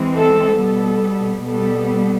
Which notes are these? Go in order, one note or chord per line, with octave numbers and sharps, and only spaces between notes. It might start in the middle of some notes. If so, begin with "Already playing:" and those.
Already playing: E3 G#3 C4
A4
B2 G3 B3 A4
B2 G3 B3 A4